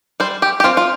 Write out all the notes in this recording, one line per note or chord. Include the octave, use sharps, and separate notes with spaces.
G3 C5
G4
G4
C4 F4
F4